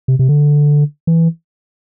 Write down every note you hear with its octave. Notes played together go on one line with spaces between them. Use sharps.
C3
C3
D3
E3